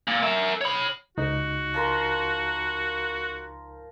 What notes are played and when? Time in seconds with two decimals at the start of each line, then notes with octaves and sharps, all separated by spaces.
0.08 A#2
0.23 A#4 E5
0.61 C#5 B5
1.18 C#2 D#4 F#4
1.74 F3 A#4 C6